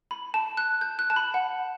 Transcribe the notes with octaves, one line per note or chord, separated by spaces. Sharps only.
B5
A5
F#6
G6
F#6
A5
B5
F#5